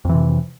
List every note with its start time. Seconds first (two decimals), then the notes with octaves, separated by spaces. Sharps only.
0.05 F2
0.09 E3
0.14 C3